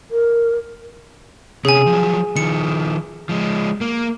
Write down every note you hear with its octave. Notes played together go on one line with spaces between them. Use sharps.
A#4
C3 C#4 G#4 G#5
F3 F#3
D#3 F3 C#7
F3 G#3
A#3